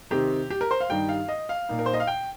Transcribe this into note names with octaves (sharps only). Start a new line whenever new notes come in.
C3 D#3 C4 D#4 G4
G4
A#4
C5
F5
G2 D#3 G3 D#4 G5
F5
D#5
F5
A#2 A#3 D#4
A#4
C5
D#5
F5
G5